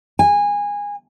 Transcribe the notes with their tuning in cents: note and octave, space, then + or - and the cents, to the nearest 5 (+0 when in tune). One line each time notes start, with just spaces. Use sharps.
G#5 -20